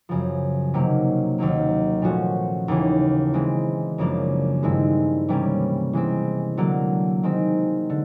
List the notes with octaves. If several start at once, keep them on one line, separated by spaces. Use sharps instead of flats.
F#2 C#3 F3
C3 D#3 F#3 A#3 C#4
D#2 D#3 F#3 A#3
A#2 F3 A3 C#4 F#4
D#2 C#3 E3
E3 G#3 C4
F#2 C#3 F3 A#3 D4
G2 D#3 G#3 C4 E4
C3 E3 G3 A#3 C#4
E3 G#3 C4
D3 F#3 A#3
D#3 G#3 C4
D3